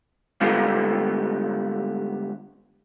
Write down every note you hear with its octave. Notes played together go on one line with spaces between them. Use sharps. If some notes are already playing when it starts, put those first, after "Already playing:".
G#2 D3 G3 A3 B3 F4